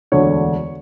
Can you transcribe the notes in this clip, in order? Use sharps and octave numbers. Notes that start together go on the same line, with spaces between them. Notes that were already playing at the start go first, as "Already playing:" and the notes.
E1 D2 D3 C#5